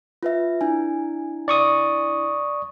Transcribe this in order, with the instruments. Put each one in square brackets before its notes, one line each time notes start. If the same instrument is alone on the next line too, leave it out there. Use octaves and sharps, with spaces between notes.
[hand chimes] F4 B4 E5
D4 E4 G#5
[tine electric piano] D5 C#6 D#6